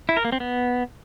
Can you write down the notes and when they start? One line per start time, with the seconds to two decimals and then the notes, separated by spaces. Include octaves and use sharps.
0.09 E4
0.17 A#4
0.25 A#3
0.32 C4
0.40 B3